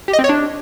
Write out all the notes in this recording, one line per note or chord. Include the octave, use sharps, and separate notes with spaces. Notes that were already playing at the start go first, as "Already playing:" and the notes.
G4
D#5
C4
C#5
D4